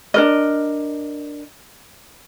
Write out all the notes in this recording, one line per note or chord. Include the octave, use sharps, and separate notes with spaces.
D4 A#4 D#5